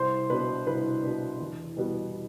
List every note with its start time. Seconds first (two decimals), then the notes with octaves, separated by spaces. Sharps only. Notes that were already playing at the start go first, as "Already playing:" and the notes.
Already playing: C2 C5
0.30 B2 B3 D4 B4
0.67 C2 B4
1.03 B2 B3 D4
1.41 E2
1.77 B2 G3 B3